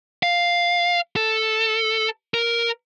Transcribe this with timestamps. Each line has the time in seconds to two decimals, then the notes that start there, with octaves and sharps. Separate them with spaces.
0.23 F5
1.16 A4
2.34 A#4